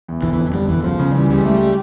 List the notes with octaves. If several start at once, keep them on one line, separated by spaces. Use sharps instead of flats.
E2
G1 E3
E3
F2
D3 G3
G1 E3
C#2 F3
C#3
E3 G3
C#2 G3
G3 A3